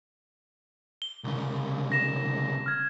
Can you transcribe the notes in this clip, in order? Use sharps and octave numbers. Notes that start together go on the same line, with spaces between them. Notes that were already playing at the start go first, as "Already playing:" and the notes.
G7
C2 C#3
A#6 E7
F6 G#6